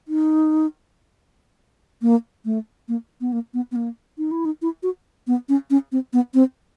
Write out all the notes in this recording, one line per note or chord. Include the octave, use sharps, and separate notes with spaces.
D#4
A#3
A3
A#3
B3
A#3
B3
B3
A#3
D#4
E4
D#4
E4
F#4
B3
C#4
C#4
C4
B3
C4